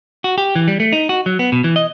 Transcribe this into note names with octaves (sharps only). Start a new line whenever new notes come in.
F#4
G4
E3
G3
A3
D#4
F#4
F#3
B3
B2
E3
D#5